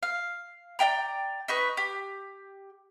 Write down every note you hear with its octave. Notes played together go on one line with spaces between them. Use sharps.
F5
D5 D#5 G5 A#5
D#4 B4 C#6
G4